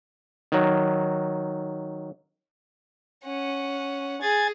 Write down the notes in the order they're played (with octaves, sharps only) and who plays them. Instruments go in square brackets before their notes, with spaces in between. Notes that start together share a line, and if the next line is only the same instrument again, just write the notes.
[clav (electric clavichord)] D#3 F#3
[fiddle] C#4 F#5
[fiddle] G#4 [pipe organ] G#5 G#6 A6